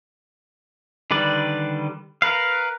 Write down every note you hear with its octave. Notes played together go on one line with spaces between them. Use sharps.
D3 D#3 G3 B4 D5
A#4 B4 F5